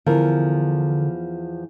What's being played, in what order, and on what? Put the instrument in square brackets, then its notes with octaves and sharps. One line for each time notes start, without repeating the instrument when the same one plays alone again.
[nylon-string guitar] E2 F3 A#4 [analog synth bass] D3